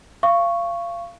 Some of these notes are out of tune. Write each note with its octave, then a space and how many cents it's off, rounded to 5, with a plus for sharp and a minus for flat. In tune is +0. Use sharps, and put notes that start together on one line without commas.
F5 -25 C#6 +0